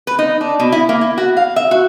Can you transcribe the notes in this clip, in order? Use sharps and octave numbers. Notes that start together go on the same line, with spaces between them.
B4
D#4
D4
B2
E4
A#3
E4
F#4
F5
E5
F#4